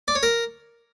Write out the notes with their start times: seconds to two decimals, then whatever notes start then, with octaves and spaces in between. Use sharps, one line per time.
0.08 D5
0.15 C#5
0.23 A#4